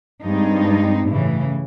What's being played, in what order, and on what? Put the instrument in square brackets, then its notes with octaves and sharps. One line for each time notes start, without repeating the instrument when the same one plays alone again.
[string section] G2 [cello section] G#3 C4 D#4
[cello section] A2 C#3 E3